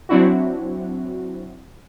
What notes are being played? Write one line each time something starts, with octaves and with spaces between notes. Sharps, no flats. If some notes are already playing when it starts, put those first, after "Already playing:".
F#3 C4 D4 E4 F#4